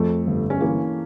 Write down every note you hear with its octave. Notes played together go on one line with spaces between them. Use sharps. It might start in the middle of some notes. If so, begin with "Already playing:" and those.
Already playing: F2 A3
G1
C#4
E3 A#3